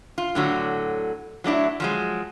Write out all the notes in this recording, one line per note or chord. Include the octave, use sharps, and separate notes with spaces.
F4
A2 D3 F#3 F#4
F#3 A3 D4 E4
F3 F#3 G#3